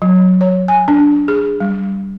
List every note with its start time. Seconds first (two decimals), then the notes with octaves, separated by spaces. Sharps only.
0.02 F#3
0.41 C#5
0.68 G#5
0.88 D4
1.28 G#4
1.60 G3